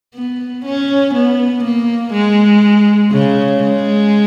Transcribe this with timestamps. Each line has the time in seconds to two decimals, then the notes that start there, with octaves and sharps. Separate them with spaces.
0.15 B3
0.66 C#4
1.14 B3
1.64 A#3
2.13 G#3
3.12 C#3
3.61 G#3